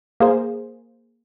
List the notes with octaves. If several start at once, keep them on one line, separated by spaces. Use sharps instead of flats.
A#3 G#4 C5